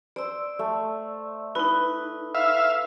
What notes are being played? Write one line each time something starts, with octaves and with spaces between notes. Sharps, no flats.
C5 D5 E6
A3
D#4 E4 B4
E5 F5